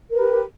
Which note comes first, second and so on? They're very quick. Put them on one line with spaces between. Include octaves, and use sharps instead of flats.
A#4 B4 G4